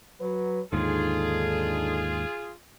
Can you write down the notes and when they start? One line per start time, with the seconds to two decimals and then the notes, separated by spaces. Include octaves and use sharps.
0.21 F#3 B4
0.73 D#2 G#2 D3 D#4 F4 G#4 A4